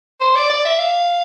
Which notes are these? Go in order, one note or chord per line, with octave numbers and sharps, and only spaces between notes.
C5
D5
D5
E5
F5